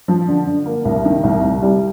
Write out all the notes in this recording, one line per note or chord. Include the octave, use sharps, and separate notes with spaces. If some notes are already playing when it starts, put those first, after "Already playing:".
F3
D3
D3
A#3
C2
D#3
C2
C2
G3